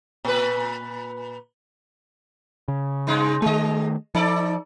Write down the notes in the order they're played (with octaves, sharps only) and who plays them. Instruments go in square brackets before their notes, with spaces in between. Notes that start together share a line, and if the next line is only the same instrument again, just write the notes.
[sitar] A#2 B4
[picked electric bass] C#3
[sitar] G2 G#3 D#4
[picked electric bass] D#3 A3 [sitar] G#3 D#5
[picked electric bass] F3 [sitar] D#4 A4 D5